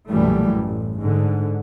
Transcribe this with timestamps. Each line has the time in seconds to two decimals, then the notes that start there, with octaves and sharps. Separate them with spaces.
0.11 B1 F#2 A#2 E3 G3 A3
0.52 A1 A2
0.99 G#2 D3